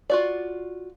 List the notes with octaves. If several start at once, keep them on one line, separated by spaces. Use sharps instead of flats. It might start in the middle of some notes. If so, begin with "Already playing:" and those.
F4 F#4 D5